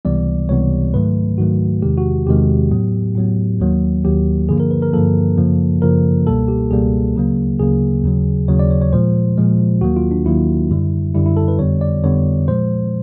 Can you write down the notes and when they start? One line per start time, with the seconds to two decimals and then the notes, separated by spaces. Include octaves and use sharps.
0.05 C#2 C3 E3 G3 B3 D5
0.49 C#2 C3 E3 G3 B3 C#5
0.94 G#2 D#3 F#3 A3 B4
1.38 G#2 D#3 F#3 A3 F#4
1.82 E2 C3 D#3 G#3 G4
1.98 F#4
2.27 E2 C3 D#3 G#3 G4
2.71 A2 F#3 B3
3.15 A2 F#3 B3
3.60 D#2 D#3 F#3 A#3
4.05 D#2 D#3 F#3 A#3 G4
4.49 G2 D3 F3 A#3 G#4
4.60 A#4
4.71 B4
4.82 A#4
4.93 G2 D3 F3 A#3 A4
5.37 F#2 C#3 F3 A#3
5.82 F#2 C#3 F3 A#3 A#4
6.27 C#2 B2 G3 A#3 A4
6.48 G4
6.71 C#2 B2 G3 A#3 G#4
7.15 D2 C#3 F#3 A#3
7.59 D2 C#3 F#3 A#3 G#4
8.04 D#2 C#3 F#3
8.48 D#2 C#3 F#3 C#5
8.59 D5
8.71 C#5
8.81 C#5
8.93 A#2 F3 G#3 C5
9.38 A#2 F3 G#3
9.81 D#2 D#3 F#3 A#3 F#4
9.96 F4
10.11 D4
10.26 D#2 D#3 F#3 A#3 E4
10.70 F#2 D3 G3
11.15 F#2 D3 G3 E4
11.26 E4
11.37 A4
11.48 B4
11.59 F2 D3 G3 B3 C#5
11.81 D5
12.03 F2 D3 G3 B3 C#5
12.48 A#2 F3 G#3 C5